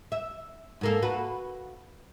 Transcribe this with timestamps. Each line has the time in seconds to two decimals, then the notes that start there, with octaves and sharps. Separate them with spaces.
0.12 E5
0.81 G#2 A#3 A4
1.02 F#4 B4